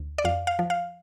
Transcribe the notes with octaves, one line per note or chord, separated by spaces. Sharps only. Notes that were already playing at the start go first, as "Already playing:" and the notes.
Already playing: D2
D5
F2 F5
F5
F3
F5